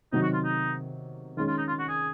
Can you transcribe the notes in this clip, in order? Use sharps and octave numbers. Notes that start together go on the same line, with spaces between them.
C3 D#3 F#3 D#4
F#4
F4
D#4
D#3 G#3 C#4 F4
F4
D#4
F4
F#4
G#4